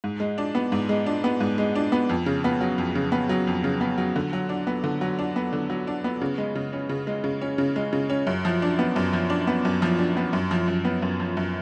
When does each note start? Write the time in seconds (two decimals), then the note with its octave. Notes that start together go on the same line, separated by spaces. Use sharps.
0.04 G#2
0.20 G#3
0.38 D4
0.55 B3
0.72 G#2
0.89 G#3
1.06 D4
1.24 B3
1.40 G#2
1.58 G#3
1.75 D4
1.92 B3
2.09 F2
2.26 C#3
2.44 B3
2.61 F#3
2.78 F2
2.95 C#3
3.12 B3
3.29 F#3
3.47 F2
3.64 C#3
3.81 B3
3.98 F#3
4.16 D3
4.33 F#3
4.49 D4
4.67 B3
4.84 D3
5.01 F#3
5.19 D4
5.36 B3
5.53 D3
5.70 F#3
5.87 D4
6.04 B3
6.22 C#3
6.38 G#3
6.55 C#3
6.73 C#4
6.89 C#3
7.07 G#3
7.24 C#3
7.41 C#4
7.58 C#3
7.76 G#3
7.93 C#3
8.10 C#4
8.27 F#2
8.45 F3
8.62 D4
8.79 B3
8.96 F#2
9.13 F3
9.30 D4
9.47 B3
9.65 F#2
9.82 F3
9.99 D4
10.17 B3
10.33 F#2
10.51 F3
10.68 F#2
10.85 B3
11.02 F#2
11.20 F3
11.37 F#2